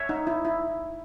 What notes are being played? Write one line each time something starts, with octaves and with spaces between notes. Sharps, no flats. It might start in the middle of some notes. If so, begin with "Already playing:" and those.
Already playing: C#5 E5
D#4
E4
E4